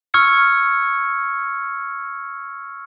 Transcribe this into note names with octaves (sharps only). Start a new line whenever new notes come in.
C#6 E6 F6 G#6 C#7